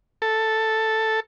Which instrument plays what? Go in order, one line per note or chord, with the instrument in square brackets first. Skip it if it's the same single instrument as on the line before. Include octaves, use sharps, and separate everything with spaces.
[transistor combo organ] A4